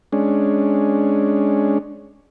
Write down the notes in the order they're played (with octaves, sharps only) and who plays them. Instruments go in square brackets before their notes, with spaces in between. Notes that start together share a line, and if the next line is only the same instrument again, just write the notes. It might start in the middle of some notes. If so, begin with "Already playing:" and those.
[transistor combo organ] G#3 C#4 D4